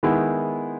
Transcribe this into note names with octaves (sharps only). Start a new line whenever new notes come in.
D#3 G#3 B3 E4